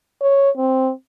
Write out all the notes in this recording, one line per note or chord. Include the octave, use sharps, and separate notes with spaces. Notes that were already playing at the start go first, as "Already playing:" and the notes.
C#5
C4